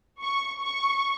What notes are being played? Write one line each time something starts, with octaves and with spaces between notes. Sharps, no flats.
C#6
C#6